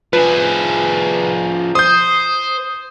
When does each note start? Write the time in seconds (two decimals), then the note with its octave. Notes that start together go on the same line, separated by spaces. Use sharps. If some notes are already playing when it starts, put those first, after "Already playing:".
0.13 F3 G#4 B4
1.75 C5 D#6 G6